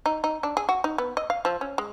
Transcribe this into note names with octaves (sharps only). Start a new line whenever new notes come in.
D#4
D#4
D4
G#4
F#4
D#4
B3
D#5
F5
F3
C#4
G#3